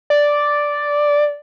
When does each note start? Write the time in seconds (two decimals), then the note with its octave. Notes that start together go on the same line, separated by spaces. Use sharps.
0.10 D5